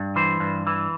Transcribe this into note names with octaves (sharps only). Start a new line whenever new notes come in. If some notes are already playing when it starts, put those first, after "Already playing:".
Already playing: G2
E3 C5
G2
E3